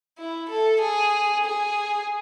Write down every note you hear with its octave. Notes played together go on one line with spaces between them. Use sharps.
E4
A4
G#4
G#4